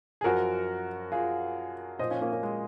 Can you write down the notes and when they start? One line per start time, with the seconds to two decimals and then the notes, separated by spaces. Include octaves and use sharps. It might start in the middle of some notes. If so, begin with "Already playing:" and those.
0.21 G#4
0.24 F#2 F3 F#4 A#4
1.12 F4 G#4
1.99 A#2 C5 D#5
2.03 F3
2.10 C#4 F4
2.21 A#3 C#4
2.32 A#3 C#4
2.43 G#3